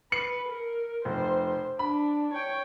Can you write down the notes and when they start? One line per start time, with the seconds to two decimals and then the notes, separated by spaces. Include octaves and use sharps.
0.12 B4 C7 C#7 F#7
0.49 A#4
1.05 F1 C5
1.79 D4 B5
2.33 C#5 G5